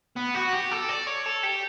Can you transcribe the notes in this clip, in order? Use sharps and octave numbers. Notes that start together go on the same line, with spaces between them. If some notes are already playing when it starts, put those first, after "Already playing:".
B3
F#4
G4
A4
D5
C#5
A4
G4